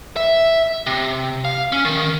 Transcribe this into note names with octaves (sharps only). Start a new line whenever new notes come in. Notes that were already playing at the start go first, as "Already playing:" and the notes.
E5
C3
F5
C#4
D#3